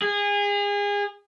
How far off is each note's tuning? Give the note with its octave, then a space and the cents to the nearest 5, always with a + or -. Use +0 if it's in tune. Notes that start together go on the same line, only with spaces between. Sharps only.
G#4 -30